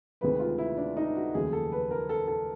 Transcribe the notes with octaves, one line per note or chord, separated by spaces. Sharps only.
D2 C3 D#3 G#3 B3 B4
F4
E4
D4
D#4
F#4
F1 D#2 C#3 F#3 G#4
A4
B4
A#4
A4
A4